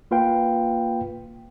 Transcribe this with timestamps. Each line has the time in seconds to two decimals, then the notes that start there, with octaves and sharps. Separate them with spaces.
0.11 A#3 F4 B4 F5 G5